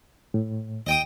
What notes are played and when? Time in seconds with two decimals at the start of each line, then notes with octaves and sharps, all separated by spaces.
0.34 A2
0.87 D#2 D#5 G5 D#6